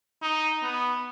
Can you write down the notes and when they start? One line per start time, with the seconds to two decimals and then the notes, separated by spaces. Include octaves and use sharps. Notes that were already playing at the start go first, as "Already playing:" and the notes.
0.23 D#4
0.63 B3